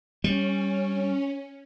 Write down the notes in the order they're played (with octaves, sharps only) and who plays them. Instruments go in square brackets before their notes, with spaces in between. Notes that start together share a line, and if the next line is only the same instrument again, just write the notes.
[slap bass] G3 [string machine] C#4